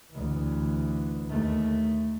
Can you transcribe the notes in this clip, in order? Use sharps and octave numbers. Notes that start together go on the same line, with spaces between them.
D2 E3
D#2 A3